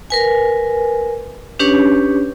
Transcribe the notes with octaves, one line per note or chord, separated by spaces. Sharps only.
A#4 B4 G#5
C#4 D4 G4 B4 C#5